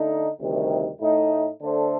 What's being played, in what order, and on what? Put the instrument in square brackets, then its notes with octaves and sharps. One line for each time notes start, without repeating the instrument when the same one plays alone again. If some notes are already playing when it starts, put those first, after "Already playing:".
Already playing: [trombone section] D3 A3 D#4
D2 C3 D#3 G3
A2 A3 D#4
D3 A3 D4 A4 C5